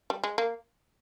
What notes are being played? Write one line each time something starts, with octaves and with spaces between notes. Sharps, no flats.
G3
G#3
A#3